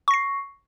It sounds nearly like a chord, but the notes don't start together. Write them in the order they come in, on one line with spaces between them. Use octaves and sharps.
C#6 A#6 C7